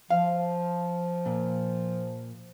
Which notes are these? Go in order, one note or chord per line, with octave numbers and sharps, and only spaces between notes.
F3 F5
A#2